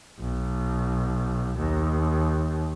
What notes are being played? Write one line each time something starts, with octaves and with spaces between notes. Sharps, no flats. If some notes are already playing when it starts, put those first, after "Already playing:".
B1
D#2